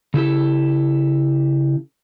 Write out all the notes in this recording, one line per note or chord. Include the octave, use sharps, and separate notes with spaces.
C#3 E4 G4 A4